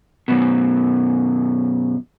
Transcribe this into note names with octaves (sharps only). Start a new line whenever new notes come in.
F#2 B2